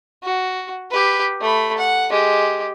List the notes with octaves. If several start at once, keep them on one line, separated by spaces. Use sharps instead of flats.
F#4
G4 B4
A3 B5
F#5
G#3 G4